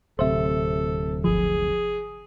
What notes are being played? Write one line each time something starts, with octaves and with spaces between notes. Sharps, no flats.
D1 C3 A4 C5 E5
G1 F3 G#4